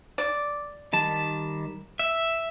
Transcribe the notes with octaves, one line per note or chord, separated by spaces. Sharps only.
D5
D#3 G3 A5
E5